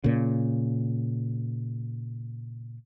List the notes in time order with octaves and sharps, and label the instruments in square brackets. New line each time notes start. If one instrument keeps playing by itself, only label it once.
[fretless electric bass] A#2 C#3